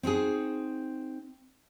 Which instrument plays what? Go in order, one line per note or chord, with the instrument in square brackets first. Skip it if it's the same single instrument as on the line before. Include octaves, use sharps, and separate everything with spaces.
[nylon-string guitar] C4 D#4 F#4 G#4